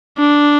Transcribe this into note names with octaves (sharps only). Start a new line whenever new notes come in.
D4